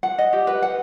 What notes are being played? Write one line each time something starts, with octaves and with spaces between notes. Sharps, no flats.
F#5
D#5
G4
B4
F#5